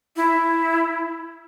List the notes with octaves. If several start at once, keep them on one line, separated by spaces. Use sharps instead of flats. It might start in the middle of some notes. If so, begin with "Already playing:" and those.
E4